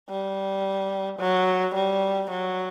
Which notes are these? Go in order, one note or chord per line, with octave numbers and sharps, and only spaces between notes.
G3
F#3
G3
F#3